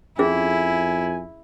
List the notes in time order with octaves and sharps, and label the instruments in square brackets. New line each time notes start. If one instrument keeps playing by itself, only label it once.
[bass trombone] F2 [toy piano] C#4 G#4 [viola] E4 [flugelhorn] G#5